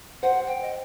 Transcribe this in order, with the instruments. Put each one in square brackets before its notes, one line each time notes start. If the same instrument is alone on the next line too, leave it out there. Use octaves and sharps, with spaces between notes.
[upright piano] C5 [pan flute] F#5
[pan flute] G5
D#5